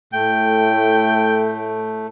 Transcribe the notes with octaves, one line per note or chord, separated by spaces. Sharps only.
A2 A3 G5